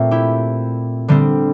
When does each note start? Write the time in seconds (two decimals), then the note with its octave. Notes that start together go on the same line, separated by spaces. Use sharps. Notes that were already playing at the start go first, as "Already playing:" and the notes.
Already playing: A#2 A3 C4
0.11 E4 G4
1.08 D3 G3 C4